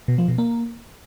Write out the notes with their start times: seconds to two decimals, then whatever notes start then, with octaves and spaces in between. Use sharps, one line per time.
0.08 B2
0.18 F3
0.28 B2
0.38 A#3